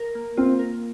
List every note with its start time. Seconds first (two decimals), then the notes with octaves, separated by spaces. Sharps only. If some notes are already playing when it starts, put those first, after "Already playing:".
Already playing: A#4
0.15 A#3
0.37 C4 F4
0.59 A#4